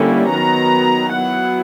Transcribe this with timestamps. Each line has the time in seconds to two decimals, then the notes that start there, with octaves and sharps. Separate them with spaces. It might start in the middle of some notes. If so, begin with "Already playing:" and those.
Already playing: D3 G3 A#3 C#4 E4
0.29 D#3 F#3 B3 A#5
1.11 F#3 B3 E4 F#5